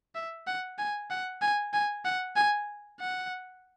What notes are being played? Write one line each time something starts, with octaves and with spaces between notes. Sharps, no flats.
E5
F#5
G#5
F#5
G#5
G#5
F#5
G#5
F#5